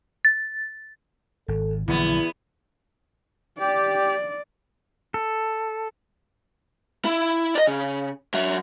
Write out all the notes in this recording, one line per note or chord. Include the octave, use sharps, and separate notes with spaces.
A6
G#1 A4
A#1 E2 D3 E3 F#3 B3 E4
G4 D5
A4
E4
D5 D#5
C#3
F#3 E5